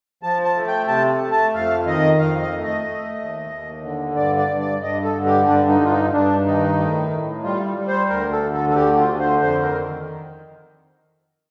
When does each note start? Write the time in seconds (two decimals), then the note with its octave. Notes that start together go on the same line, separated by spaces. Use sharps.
0.23 F3 A5
0.44 A5
0.56 A3
0.67 G5
0.88 C3 A5
1.21 A3
1.31 A5
1.53 F2 F5
1.86 D#3 D#5
2.19 F2 F5
2.42 D#5
2.52 A3
2.63 D#5
2.85 A3
3.18 D#2
3.50 D#2
3.83 D3
4.16 G2 D5
4.37 D5
4.49 G2
4.59 D5
4.81 G2 D#5
5.03 A4
5.15 D3
5.26 G4
5.47 G2 D4
5.68 D#4
5.80 G2 F4
5.91 D#4
6.13 G2 D4
6.46 D#3 D#4
6.78 A2
7.10 A2
7.43 G3 F4
7.77 G3
7.88 C5
8.09 D2 A#4
8.32 A4
8.42 D3
8.53 A4
8.69 A4
8.75 D2 G4
8.97 F4
9.08 D3
9.19 C5
9.41 F2 C5
9.62 A#4
9.73 D#3